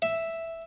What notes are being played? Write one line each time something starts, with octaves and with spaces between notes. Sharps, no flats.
E5